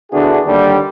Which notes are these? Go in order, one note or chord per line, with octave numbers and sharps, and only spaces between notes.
D3 B3 D4 E4 F#4 G#4
D#2 D3 G3